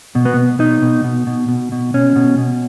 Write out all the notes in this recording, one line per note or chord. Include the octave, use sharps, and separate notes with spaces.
B2
B3
B2
B2 D#4
B2
B2
B2
B2
B2
B2 C#4
B2
B2